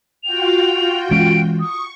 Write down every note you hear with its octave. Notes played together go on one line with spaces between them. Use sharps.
F4 F#4 G5 F7
E3 G#3 C#4 D7
C#6 D#6